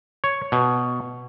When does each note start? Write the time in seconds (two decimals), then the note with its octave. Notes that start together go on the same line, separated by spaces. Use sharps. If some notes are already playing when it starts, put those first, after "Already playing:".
0.24 C#5
0.52 B2